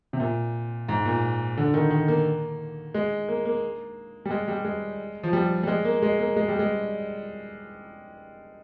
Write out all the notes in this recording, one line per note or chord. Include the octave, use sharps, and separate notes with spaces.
C3
A#2
G#2
A#2
D3
D#3
D#3
A#3
G#3
A#3
A#3
G3
G#3
G3
G#3
F3
G3
G3
G#3
A#3
G#3
A#3
G#3
G3
G#3